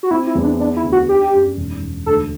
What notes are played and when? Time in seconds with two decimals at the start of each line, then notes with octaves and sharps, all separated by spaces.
0.03 F#4
0.11 C4 E4
0.27 E4
0.35 E2
0.43 D4
0.60 B3 D4
0.77 E4
0.84 D2
0.92 F#4
1.09 D4 G4
1.33 F#2
1.57 E1
1.81 E1
2.06 D2 A4